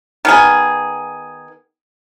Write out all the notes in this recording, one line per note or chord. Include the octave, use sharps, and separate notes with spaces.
D#3 B3 G#4